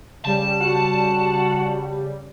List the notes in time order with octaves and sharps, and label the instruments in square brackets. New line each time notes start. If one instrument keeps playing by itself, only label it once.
[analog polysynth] C#3 G3 [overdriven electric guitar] A5
[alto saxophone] F#4